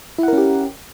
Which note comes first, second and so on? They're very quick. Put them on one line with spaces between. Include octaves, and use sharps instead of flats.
E4 F#5 A#4 C#4 G4